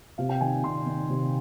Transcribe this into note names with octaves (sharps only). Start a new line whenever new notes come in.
C3 F5
G5
D#3 G#5
C3 C6
D#3
C3